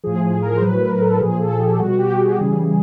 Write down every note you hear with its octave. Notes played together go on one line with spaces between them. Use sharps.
A2 F3 G#4
G#4
A#4
C5
A2 F#3 B4
A#4
A4
A#2 F3 G#4
A4
G4
B2 G3 F#4
G4
G#4
C#3 E3 G3